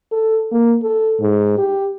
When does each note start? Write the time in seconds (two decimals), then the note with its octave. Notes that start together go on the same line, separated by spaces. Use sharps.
0.12 A4
0.51 A#3
0.83 A4
1.20 G#2
1.58 G4